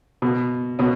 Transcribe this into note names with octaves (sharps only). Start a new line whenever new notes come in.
B2
B2 C#4